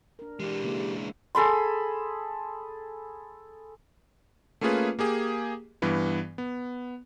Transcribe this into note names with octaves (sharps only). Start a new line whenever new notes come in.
D4 A#4
E3 G#3 D4 G4
C#3 A#3 E4
G#4 A4 B5 C6
A3 A#3 C#4 F4 G#4 B4
A#3 G4 G#4
G2 E3 B3
B3